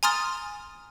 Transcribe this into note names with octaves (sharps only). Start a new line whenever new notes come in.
G#5 A#5 C6 D#6 F6 A6